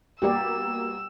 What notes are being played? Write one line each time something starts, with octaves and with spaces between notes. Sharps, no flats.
B2 G3 A#3 G4 D5 E6